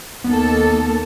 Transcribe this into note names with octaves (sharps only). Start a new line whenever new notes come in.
D#2 A#3 B3 A4